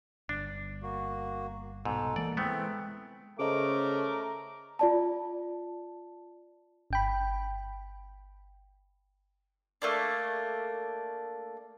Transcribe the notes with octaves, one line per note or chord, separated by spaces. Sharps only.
G1 D4
A#3 F#4
C2 G#2 B2 A4
E3 G#3 A#3 D5
E3 G#3 A3 B3 C4
C#3 A3 A4 A#4 C5 D#5 D6
F4 D5 A5
G1 G5 B5
A3 A#3 D4